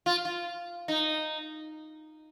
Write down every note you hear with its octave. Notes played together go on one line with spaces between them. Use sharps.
F4
F4
D#4